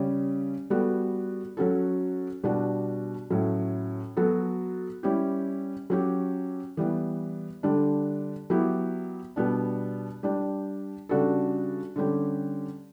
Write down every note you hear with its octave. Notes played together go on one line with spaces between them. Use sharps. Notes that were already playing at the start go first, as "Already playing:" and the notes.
Already playing: C#3 G3 C#4
G3 B3 F#4 A4
F#3 C#4 F#4 A4
B2 G3 D4 F#4
A2 F#3 C#4
F#3 B3 F#4 A4
G3 C#4 E4 G4
F#3 C#4 G4
E3 G3 B3
D3 G3 D4
F#3 B3 E4 G4
B2 G3 B3 D4
G3 D4 G4
C#3 G3 D4 F#4 A4
D3 G3 C#4 G4